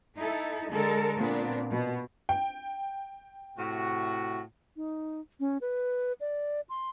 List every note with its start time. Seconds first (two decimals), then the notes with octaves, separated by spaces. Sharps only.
0.16 D#4 E4 A4
0.71 D3 G#3 A4 A#4
1.16 A#2 B3 C4 D4
1.70 B2
2.29 G5
3.57 A2 C3 F#4
4.76 D#4
5.40 C#4
5.61 B4
6.21 D5
6.69 C6